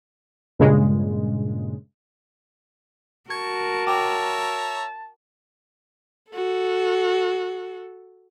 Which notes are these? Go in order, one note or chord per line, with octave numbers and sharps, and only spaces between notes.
G2 A#2 C#3 G#3
F#4 A#4 A5 C#6 G#6
C#5 E5 G5 A#5 D6
F#4 A4